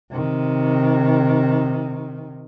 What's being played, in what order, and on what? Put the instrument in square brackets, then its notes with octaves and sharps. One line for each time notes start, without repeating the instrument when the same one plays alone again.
[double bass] C3 D#3